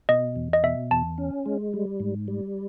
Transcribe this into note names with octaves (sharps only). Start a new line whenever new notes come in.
B2 D#5
E2
D#5
B2 E5
E2 A5
C#4
G#3
G3
G#2
G3